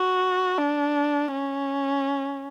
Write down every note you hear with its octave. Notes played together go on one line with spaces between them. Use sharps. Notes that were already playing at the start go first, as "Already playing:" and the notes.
Already playing: F#4
D4
C#4